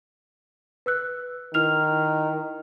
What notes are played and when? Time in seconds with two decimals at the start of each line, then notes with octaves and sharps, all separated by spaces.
0.86 B4 E6 F#6
1.54 D#3 E4 F6 F7